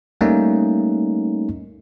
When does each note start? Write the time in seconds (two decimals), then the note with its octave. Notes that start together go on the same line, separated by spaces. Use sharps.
0.21 G3 A3 A#3 C#4 D#4